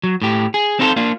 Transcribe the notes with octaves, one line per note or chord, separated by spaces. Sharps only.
F#3
A2 G4
G#4
C4 D#4 F4 F#4 A4 C5
A#3 D4 F4